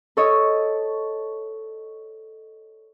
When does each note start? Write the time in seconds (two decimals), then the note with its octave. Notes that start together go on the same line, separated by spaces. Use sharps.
0.17 A4 C#5 D#5